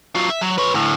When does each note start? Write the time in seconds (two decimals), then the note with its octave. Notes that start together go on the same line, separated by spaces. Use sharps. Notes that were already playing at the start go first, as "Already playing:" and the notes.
0.15 F#3 F4
0.30 E5
0.41 F#3
0.58 B4 C#5
0.74 D2 A2